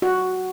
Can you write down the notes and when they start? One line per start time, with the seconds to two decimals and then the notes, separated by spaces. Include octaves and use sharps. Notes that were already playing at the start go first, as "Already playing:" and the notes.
0.02 F#4